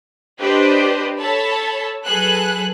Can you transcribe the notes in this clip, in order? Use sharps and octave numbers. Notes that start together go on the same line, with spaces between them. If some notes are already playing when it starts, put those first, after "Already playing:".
D4 G4 B4 C5 D#5
A4 C#5 A5 B5
F#3 G#4 A4 B4 F#6